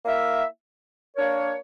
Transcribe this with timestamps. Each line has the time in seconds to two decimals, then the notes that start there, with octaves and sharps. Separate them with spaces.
0.05 A#3 E4 A#4 E5
1.17 A#3 D4 A#4 C#5